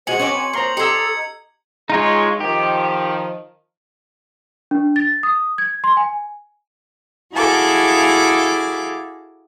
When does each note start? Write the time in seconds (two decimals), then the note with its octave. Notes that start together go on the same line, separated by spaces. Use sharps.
0.07 A#2 G#3 F#4 C5 G#5 C#7 F#7
0.19 C4 C#4 B4 C#5 G#5 D6
0.53 A#3 C5 A#5 C6
0.77 D#4 G4 A4 A#5 C6 E6 G#6 C#7
1.90 G#3 D#4 F4 C#5
2.40 D#3 F3 G4
4.71 D4
4.96 A6
5.23 D#6
5.58 G#6
5.84 C6
5.97 G#5
7.34 E4 F#4 G#4 A4 F5 D6